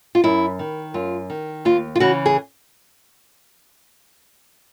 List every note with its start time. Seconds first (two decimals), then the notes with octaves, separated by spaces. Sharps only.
0.15 F4
0.24 F#2 E4
0.59 D#3
0.94 F#2 F4
1.30 D#3
1.65 D#2 F4
1.96 F4
2.00 C#3 E3 F#4
2.26 G#4